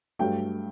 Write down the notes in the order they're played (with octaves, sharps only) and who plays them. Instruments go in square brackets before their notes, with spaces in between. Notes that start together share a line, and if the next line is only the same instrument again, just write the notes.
[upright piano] G2 F#3 A3 G5